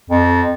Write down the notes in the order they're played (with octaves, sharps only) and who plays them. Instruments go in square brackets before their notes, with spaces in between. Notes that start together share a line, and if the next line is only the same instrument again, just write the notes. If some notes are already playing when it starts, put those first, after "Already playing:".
[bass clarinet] F2